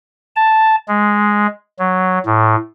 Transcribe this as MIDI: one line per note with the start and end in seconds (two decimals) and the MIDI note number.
0.36 0.76 81
0.88 1.47 56
1.79 2.19 54
2.26 2.56 45